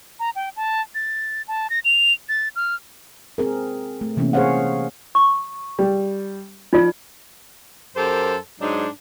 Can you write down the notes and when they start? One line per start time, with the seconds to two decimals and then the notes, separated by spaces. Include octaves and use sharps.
0.20 A#5
0.36 G5
0.57 A5
0.95 A6
1.48 A5
1.70 A#6
1.85 F7
2.29 A6
2.56 F6
3.38 C4 G#4 A#4
4.01 A3
4.17 C3 E3 A#3 B3 C#4
4.33 G#4 C5 C#5 F5 F#5
5.15 C#6
5.79 G3
6.73 F3 D#4 F4 D5
7.96 F#2 G4 A4 A#4 C5
8.60 G#2 F#3 D4 D#4